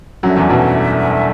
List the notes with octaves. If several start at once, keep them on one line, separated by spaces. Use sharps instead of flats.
F#2 F#3 G3 D4 A4 E5
E2 E3
B1 B2